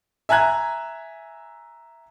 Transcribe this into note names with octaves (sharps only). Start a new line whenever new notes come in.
E5 G#5 A#5 F#6 G#6